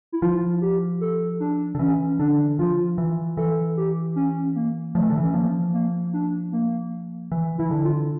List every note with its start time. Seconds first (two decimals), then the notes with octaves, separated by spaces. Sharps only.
0.12 E4
0.22 F3 F4
0.61 G4
1.01 A4
1.40 D4
1.75 D3
1.79 E3 C#4
2.19 D3 D4
2.58 F3 F4
2.98 E3
3.37 E3 A4
3.77 G4
4.16 C#4
4.56 A#3
4.95 F3 A3
5.02 E3
5.10 D3
5.18 E3
5.23 C#4
5.34 F3 A#3
5.74 A#3
6.13 D4
6.52 A#3
7.32 E3
7.58 E3 E4
7.71 D3
7.84 F4